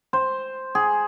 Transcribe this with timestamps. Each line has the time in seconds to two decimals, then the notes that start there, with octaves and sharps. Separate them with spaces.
0.13 C5
0.75 G#4